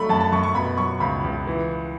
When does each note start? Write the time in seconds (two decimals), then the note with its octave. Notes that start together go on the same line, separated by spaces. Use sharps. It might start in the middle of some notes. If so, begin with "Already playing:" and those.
Already playing: F#3 A3 B5 C#6
0.09 F#2 A5
0.20 A5
0.32 F#2 C#6
0.43 C#6
0.55 B2 B5
0.77 F#3 C#6
1.00 C#2 B5
1.24 C#2
1.47 E3